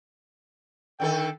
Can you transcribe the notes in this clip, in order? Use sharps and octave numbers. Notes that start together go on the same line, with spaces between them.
D3 D#3 A4 G5